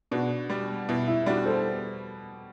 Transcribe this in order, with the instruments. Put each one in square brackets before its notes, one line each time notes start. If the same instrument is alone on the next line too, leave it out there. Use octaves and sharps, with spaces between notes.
[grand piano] B2 [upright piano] D4 F#4
[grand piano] G3
[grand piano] B2 [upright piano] E4
[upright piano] E4
[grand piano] G3 [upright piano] D4 F#4
[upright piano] A4 C5